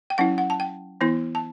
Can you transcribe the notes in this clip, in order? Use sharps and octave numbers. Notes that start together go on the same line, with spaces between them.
G5
F#3 C#4 E4 F#5
F#5
A5
G5
E3 B3 E4
A5